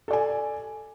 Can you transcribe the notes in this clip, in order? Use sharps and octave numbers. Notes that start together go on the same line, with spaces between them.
A4 D5 G#5